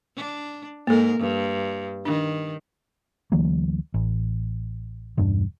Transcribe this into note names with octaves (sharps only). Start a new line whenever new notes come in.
D4
G#2 A#3 A4 A#4
G2
D#3 D4
D2 E3 F#3 A#3
A1
E1 G2 D4